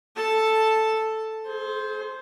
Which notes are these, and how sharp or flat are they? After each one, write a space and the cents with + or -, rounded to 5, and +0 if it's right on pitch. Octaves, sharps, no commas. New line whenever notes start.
A4 +0 A5 +0
G#4 +45 C5 +0